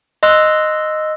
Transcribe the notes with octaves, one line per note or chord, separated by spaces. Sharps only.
D#5 C6 E6 F#6